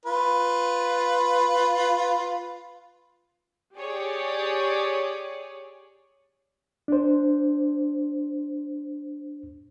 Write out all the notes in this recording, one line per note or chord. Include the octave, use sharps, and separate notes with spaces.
F4 B4
G4 G#4 C#5 D5
D4 C5